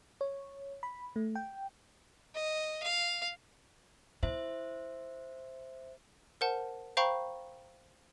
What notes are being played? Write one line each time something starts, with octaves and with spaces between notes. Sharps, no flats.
C#5
B5
A3
G5
D#5
F5
E4 C5 E5
A#4 C5 F#5 A5
C5 F5 G5 A#5 B5 C#6